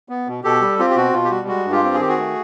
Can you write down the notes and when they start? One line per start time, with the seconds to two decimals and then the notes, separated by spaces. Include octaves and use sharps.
0.09 B3
0.27 B2
0.44 B2 G4 A4
0.61 G3
0.79 C4 F4 G4
0.90 G4
0.96 B2 F#4
1.13 B2 F4
1.25 G4
1.30 G3 F#4
1.48 G#3 F#4
1.65 G2
1.72 F4 G4
1.83 C4
1.94 G#4
2.00 D#3 G4
2.08 F#4 G#4
2.18 A3